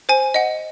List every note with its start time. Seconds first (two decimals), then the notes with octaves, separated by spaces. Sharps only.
0.09 C5 G#5
0.34 D#5 F#5